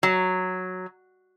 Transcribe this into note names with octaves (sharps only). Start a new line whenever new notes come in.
F#3